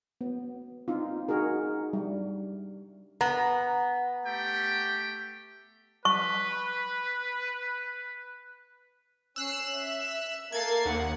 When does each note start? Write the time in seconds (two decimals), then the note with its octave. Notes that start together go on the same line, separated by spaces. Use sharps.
0.21 B3
0.88 C4 D#4 F4
1.28 D#4 F#4 G#4 A#4
1.93 G3
3.21 B3 A#5
4.26 A3 G4 G5
6.05 B4 C#6
9.36 C#4 E6 F#6 C7 E7
9.76 E5
10.52 A#3 A4 G#6 A6 C7
10.86 D#2 F#5